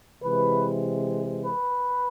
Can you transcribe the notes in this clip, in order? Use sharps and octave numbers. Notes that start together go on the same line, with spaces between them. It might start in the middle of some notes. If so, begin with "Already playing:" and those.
C3 E3 G#3 B4
B4